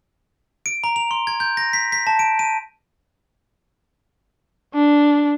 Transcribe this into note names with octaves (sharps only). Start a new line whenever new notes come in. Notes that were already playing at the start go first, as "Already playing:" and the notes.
D7
A#5
F7
C6
G#6
G6
A#6
B6
B6
A5
D7
D#7
D4